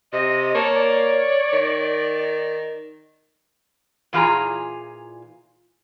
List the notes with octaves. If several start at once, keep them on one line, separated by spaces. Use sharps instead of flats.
C3 D#5
A#3 C#5 A5
D5
D#3
A#2 E3 F4 G#4 G#5 A#5